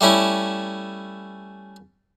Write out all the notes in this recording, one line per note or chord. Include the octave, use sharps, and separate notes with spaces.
G3 A3 C#4 E4